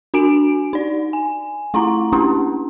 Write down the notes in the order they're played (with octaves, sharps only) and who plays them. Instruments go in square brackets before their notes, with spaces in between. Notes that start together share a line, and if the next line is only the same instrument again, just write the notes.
[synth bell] D4 F#4 G#5 D7
D#4 D5
G#5
A3 E4 F4 F#5 A#5
A#3 C#4 D4 E4 G4